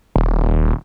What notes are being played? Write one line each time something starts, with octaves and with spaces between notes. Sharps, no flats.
D#1